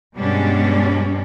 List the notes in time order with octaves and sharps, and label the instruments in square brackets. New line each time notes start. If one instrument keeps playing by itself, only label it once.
[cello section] G2 B2 G3 G#3 C#4 D4